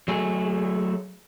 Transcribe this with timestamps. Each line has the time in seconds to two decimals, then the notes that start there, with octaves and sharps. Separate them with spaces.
0.08 F#3 A3 G#4